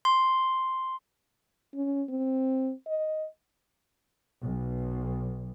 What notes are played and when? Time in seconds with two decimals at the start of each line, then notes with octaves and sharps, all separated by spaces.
0.05 C6
1.74 C#4
2.09 C4
2.87 D#5
4.42 B1